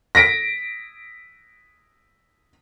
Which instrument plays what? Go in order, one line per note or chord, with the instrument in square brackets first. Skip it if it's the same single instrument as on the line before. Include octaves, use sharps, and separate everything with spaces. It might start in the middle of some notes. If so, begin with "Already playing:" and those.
[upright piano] A#6 B6 D7